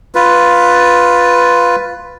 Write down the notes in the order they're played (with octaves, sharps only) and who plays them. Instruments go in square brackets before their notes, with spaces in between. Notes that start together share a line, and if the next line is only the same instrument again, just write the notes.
[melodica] F4 B4